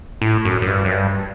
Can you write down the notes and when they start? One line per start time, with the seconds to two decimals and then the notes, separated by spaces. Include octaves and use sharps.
0.22 A2
0.45 F#2
0.62 F#2
0.67 G2
0.85 F#2
0.91 G2